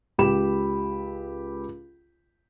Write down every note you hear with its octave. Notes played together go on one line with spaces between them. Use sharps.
C#2 G4 B5 E7